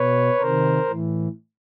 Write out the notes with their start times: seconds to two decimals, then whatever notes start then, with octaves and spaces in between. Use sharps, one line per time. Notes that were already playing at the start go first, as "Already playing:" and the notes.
Already playing: B2 B4 C#5
0.40 C3 D#3 A#4 C5
0.89 A2 E3